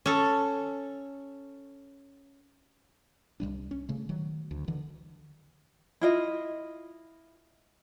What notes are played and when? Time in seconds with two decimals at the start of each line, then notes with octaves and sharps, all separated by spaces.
0.06 C#4 A4
3.40 C2 G#2 G3 D4
3.71 C#4
3.89 C#3 A3
4.09 D#3 F#3
4.51 D2
4.68 D3 E3
6.01 E4 F4 D#5